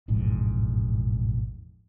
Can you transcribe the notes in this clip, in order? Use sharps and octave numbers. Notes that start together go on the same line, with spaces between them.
E1 A1 F2 G#2